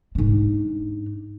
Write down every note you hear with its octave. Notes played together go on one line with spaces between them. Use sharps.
G#2 D4